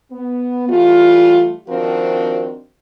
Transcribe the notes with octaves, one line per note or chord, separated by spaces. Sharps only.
B3
E3 G3 A3 F4
D#3 F3 C4 D4 F#4 A#4